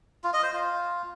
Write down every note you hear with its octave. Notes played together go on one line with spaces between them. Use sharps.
F4
D#5
C5
F4